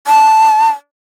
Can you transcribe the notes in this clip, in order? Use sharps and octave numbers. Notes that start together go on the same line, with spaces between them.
A5